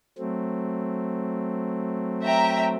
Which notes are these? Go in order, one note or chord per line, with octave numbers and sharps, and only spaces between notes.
F#3 A3 C4
E5 G5 A#5